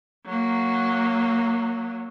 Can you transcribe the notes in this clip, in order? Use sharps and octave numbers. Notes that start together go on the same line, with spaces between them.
F#3 A#3